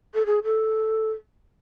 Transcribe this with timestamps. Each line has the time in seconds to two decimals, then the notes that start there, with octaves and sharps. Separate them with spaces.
0.14 A4
0.26 G#4
0.44 A4